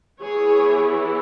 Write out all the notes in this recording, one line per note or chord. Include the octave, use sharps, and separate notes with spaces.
E3 B3 E4 G#4 C#5